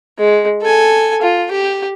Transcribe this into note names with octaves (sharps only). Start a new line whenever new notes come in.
G#3
A4 G#5
F4
G4